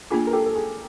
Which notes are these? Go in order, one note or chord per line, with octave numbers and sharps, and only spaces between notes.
A#3 D4 F4 G#4
A#4
G4 A4
A4
G#4